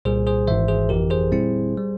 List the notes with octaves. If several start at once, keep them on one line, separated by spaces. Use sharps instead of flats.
C2 A#2 G3 G#4 C5
G#4 C5
G#1 G#2 E3 C5 E5
G#4 C5
G1 F2 E3 G4 A#4
G#4 C5
A#2 G3 C4 E4
G3